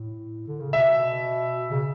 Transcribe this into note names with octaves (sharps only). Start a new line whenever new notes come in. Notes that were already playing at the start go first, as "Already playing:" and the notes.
Already playing: A2
D3
C#3
B2 E5
C#3